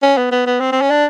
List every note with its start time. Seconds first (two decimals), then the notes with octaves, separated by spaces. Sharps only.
0.03 C#4
0.17 B3
0.32 B3
0.46 B3
0.60 C4
0.72 C4
0.82 C#4
0.90 D4